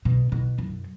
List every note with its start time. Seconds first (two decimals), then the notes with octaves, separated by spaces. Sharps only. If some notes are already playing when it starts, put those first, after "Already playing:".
0.05 B2
0.32 B2
0.58 F#2